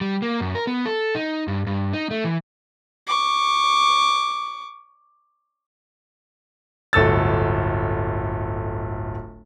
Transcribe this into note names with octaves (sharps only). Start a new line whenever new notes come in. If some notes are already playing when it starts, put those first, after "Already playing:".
G3
A#3
F#2
A#4
B3
A4
D#4
G2
G2
D#4
A3
E3
C#6 D6
D1 G1 A4 E6 A6